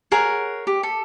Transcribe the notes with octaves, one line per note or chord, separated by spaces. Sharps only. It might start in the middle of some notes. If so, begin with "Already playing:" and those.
G#4 A#4 C#5 F#5
G4
A4